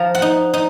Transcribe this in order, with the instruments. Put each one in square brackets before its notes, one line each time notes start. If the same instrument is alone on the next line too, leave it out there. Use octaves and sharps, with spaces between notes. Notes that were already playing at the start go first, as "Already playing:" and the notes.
Already playing: [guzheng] F3 A#5
F#5
D#4
D#4